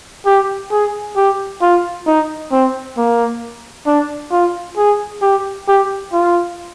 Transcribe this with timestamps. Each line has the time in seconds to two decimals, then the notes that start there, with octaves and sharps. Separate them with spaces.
0.26 G4
0.72 G#4
1.16 G4
1.62 F4
2.07 D#4
2.52 C4
2.97 A#3
3.86 D4
4.32 F4
4.77 G#4
5.22 G4
5.68 G4
6.13 F4